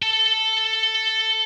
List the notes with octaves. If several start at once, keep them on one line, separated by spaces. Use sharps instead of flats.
A4 A5